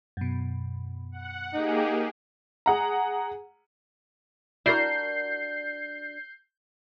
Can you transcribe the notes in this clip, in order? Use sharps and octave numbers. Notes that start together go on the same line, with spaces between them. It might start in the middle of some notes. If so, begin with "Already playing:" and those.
F#2 B2
F#5
A#3 D#4 G4 G#4
G#4 F#5 A#5
D4 E4 F#4 A#4 D5 G6 C7